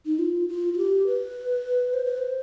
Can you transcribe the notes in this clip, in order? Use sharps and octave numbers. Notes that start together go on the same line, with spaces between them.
D#4
F4
F4
F4
G4
B4
C5
B4
C5